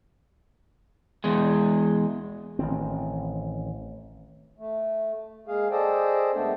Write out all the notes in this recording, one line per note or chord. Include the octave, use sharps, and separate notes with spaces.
E2 G#3
A1 D#3 C4
A3
G#3 A#3 G#4 F5
G#4 A4 C5 D5 D#5 G5
F#2 G#3 A3 B3 D4